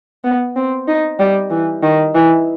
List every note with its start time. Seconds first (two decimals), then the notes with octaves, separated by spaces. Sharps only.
0.24 B3
0.56 C4
0.88 D#4
1.19 G3
1.50 E3
1.83 D#3
2.15 E3